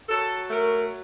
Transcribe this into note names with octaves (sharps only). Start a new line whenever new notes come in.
F#3 A4
A3 A#4